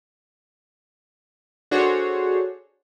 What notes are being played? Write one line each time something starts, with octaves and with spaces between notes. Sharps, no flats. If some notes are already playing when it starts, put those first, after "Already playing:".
D4 F#4 G#4 A4 C5 C#5